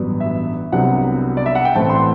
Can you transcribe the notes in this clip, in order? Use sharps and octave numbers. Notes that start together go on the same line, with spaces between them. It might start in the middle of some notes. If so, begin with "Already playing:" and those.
Already playing: A1 G2 F#3 B3 D4
E5
C2 C3 F#3 B3 D4 F#5
D5
E5
F#5
G5
A1 A2 E3 A3 C4 A5
C6